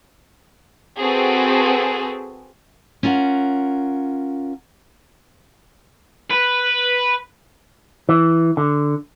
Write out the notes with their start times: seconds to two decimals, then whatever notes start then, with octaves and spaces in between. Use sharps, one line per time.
0.99 C4 F#4 G#4 A4 B4
3.03 C#4 F4 A#4 F#5
6.30 B4
8.09 E3
8.57 D3